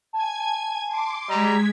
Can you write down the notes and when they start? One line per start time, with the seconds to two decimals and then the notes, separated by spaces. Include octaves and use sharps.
0.13 G#5 A5 G#6
0.87 C6 D6
1.29 G3 G#3 D#5 A#5 G#6 B6